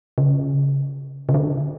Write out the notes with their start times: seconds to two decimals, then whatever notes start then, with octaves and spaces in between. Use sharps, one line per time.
0.18 C#3
1.29 C#3
1.34 D3